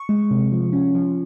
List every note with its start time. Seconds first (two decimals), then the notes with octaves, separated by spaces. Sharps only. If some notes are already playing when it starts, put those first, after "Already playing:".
Already playing: C#6
0.09 G#3
0.31 C3
0.52 F3
0.73 C#4
0.95 F3